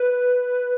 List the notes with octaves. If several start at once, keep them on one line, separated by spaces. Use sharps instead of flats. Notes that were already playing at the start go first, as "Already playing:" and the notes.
Already playing: B4